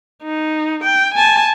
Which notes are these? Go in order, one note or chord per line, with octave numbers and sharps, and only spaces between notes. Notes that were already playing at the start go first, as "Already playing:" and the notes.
D#4
G5
G#5 A5